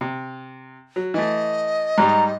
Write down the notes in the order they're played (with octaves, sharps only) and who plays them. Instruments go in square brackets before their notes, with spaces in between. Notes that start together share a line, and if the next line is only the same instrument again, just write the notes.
[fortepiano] C3
F#3
[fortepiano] E3 A3 [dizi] D#5
[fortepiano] G#2 G3 D#4 [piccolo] A#5